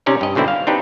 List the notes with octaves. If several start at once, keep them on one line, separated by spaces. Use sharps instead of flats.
C3 C#4 D#4 D5 D#5
G2 D#5
G#2 B2 D3 C4 E4
F5
C4 D4 D#4 G4 B4